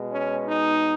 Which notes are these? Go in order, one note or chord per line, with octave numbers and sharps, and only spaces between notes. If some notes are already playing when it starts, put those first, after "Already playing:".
Already playing: B2 G#3
C#4
D#4